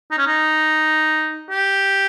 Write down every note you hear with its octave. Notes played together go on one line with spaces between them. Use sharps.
D#4
C#4
D#4
G4